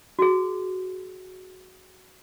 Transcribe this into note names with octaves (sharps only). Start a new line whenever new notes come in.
F#4 G#4